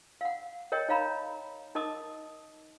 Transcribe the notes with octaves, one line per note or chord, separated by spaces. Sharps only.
F5 F#5
A#4 C#5 D#5 G5
D#4 C#5 F5 A#5 B5
D#4 A#4 D#5 A5 D6 D#6